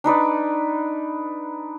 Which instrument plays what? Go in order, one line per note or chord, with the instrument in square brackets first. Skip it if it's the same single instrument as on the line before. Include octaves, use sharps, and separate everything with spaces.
[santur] D4 D#4 B4 D5